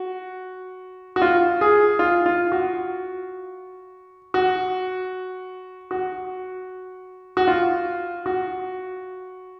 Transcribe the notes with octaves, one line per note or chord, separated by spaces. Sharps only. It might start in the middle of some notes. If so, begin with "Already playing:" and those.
Already playing: F#4
F#4
F4
G#4
F4
F4
F#4
F#4
F#4
F#4
F4
F#4